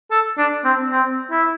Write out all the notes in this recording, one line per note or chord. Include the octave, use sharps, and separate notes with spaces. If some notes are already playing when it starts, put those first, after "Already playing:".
A4
D4
C4
C4
E4